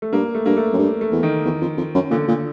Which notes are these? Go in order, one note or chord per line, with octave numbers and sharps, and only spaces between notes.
A3
G2 A#3
A3
G2 A#3
A3
F#2
G2
A3
E2
D#3
E2
F2
F2
F#2
A#2 D3
A#2